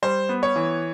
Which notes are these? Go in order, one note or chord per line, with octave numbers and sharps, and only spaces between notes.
G3 C5
B3
C#5
E3